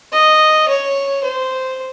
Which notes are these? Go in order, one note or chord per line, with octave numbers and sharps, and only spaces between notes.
D#5
C#5
C5